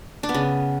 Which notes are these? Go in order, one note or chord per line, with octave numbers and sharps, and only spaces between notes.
D4
B3
C#3